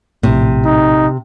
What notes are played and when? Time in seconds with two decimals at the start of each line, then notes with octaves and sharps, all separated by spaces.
0.23 A#1 A2 C3
0.65 D#4